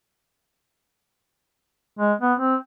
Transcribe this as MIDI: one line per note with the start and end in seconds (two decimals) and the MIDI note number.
1.99 2.13 56
2.21 2.34 59
2.40 2.56 60